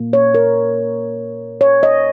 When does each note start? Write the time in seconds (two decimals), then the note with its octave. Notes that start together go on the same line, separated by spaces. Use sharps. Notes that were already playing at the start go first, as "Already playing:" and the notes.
Already playing: A#2 A#3
0.13 C#5
0.35 A#4
1.61 C#5
1.83 D#5